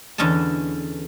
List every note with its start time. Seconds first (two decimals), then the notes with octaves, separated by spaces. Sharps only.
0.18 E2 D3 C#4 D#5 A5